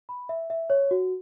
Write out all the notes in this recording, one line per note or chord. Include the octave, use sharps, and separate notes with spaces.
B5
E5
E5
C#5
F#4